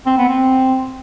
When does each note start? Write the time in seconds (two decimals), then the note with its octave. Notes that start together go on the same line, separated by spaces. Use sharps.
0.06 C4
0.18 B3
0.29 C4